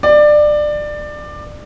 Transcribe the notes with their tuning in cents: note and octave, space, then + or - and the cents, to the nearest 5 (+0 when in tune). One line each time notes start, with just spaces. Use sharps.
D5 +20